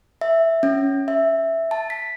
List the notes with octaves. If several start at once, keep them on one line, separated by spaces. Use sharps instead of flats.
E5
C#4
E5
A5
B6